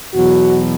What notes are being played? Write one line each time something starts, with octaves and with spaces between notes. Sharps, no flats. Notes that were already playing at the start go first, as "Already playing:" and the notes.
E2 B2 F#3 F#4